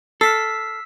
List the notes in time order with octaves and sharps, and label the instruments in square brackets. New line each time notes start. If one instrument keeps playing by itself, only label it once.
[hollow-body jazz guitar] A4 [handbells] E6 B6 [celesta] F6 C7